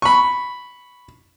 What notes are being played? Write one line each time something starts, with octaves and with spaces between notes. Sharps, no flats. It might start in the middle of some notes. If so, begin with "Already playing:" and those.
B5 C#6